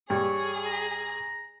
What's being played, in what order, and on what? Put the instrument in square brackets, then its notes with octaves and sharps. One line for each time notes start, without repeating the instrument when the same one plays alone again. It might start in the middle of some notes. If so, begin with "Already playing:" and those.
[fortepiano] G2 [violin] G#4 [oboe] C#5
[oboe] A#5